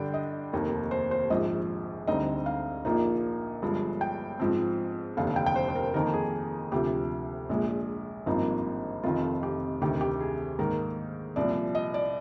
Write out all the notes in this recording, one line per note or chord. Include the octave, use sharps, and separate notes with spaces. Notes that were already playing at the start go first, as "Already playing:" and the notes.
Already playing: G2 D3 G3 D4 G5
D#5
F1 D#2 D#3 A#3
C5
C5
A#1 G#2 F3 D#5
D2 D3 G3 C4 D#4 D#5
F5
A#1 A#2 F3 A#3 D#4
G1 G2 F3 G#3
G5
G#2 F3 C4
F1 D#2 D3 F5
F5
G5
G5
C5
C5
A#4
F2 D#3 A#3 D#4 A#4
G#4
D2 C3 F3 G4
A#1 A#2 G#3
G#1 G2 F3 A#3 D#4
F1 F2 D#3 F4
G4
D2 C3 D#3 G4
G4
G#4
G#2 D#3 A#3 A#4
C2 A#2 F3 D5
D#5
D5